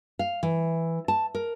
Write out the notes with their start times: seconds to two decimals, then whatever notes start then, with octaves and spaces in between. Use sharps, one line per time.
0.19 F5
0.43 E3
1.08 A5
1.35 A#4